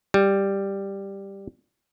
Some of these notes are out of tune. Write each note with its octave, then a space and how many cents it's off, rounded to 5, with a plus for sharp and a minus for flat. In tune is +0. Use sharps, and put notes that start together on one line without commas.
G3 +5